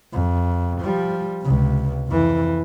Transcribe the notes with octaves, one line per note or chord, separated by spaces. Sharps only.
F2
F3 G3
C#2 C3
F2 E3